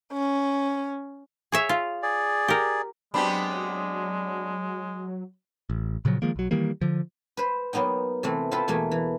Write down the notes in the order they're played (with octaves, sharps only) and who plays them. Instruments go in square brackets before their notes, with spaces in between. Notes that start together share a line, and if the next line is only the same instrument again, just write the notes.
[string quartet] C#4
[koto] G#4 C#5 E5
F4
[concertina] G#4 D5
[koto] G4 A#4
[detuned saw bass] F#3 [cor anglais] G#3 [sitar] B3 C4 D4 [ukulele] G4 B5
[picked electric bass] A1
A#2 C#3 F3 F#3
D#3 F3 G#3 A#3
B1 F#3
D#3 E3 G3 A#3
D3 F3
[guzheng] B4 C5
F#3 A#3 B3 D#4 G5
C3 E3 A3 C4
C4 F4 A4 B4 C5
E2 B2 A3 A#3 G#5
E3